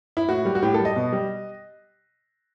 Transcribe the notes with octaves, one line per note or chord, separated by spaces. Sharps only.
E4
A2 F#4
G3
F#4
A2 G4
A4
G3
D#5
B2
G3